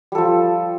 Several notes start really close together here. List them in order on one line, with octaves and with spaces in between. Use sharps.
G3 A4 F3